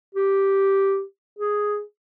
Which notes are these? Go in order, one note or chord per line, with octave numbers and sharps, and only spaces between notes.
G4
G#4